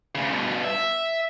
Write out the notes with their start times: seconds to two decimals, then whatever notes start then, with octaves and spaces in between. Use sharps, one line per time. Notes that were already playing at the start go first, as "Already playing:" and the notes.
0.15 D2 C#3
0.33 G2 B2
0.64 E5